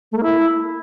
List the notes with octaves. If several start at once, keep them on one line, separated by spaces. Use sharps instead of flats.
A3
A#3
E4